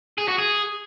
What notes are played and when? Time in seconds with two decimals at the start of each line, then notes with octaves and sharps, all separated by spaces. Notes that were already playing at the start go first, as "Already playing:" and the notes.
0.18 G#4
0.28 F#4
0.38 G#4